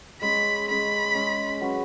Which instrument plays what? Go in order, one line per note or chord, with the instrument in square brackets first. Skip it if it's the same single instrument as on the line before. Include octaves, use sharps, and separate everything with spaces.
[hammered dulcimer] G#3 C#4 G#4 [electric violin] B5
[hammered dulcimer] G#3 C#4 G#4 [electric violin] B5
[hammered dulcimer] G#3 C#4 G#4
F#3 C#4 F#4 B4